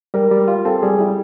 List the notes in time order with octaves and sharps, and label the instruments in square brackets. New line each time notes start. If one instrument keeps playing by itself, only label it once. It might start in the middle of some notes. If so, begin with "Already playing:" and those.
[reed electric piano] G3 [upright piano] A#4
[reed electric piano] G3
F4
[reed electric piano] C4 [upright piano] A4
[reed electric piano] G3 [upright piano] G#4
[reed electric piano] G3 [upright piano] E4